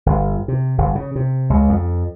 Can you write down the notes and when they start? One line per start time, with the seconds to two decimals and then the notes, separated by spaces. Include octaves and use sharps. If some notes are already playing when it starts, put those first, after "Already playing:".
0.06 G1
0.48 C3
0.78 G1
0.95 C#3
1.16 C3
1.50 C#2
1.69 F2